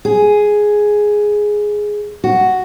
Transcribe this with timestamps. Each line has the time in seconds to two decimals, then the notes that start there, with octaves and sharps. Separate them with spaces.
0.05 G#4
2.24 F#4